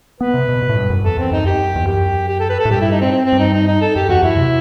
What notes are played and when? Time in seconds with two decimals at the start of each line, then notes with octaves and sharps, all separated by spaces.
0.20 B3 B4
0.34 C3
0.49 B2
0.62 B2
0.69 A2
0.76 G2
0.90 F#2
1.04 E2 A4
1.17 E2 C4
1.31 F#2 D#4
1.45 F#2 G4
1.75 E2
1.87 F#2 G4
2.28 G4
2.39 A4
2.49 B4
2.59 A4
2.65 A2
2.70 G2 G4
2.81 E4
2.92 D#4
3.01 C4
3.11 C4
3.25 C4
3.32 G2
3.39 D#4
3.54 D#4
3.67 D#4
3.81 A4
3.95 F#2 G4
4.09 E2 F#4
4.23 F#2 E4
4.37 C3